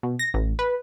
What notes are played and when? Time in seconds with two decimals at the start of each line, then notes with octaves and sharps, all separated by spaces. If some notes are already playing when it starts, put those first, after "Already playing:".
0.03 B2
0.19 A#6
0.34 A1
0.59 B4